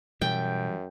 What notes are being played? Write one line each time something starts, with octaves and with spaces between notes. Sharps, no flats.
F#2 B2 E3 G3 G5